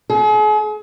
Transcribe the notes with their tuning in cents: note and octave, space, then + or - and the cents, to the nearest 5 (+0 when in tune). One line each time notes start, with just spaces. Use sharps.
G#4 +40